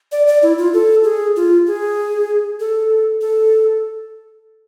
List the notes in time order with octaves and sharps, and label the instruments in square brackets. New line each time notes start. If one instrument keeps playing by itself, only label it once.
[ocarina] D5
D5
E4
F4
A4
G#4
F4
G#4
A4
A4